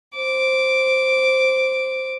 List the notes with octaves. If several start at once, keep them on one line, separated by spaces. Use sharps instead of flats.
C5 D6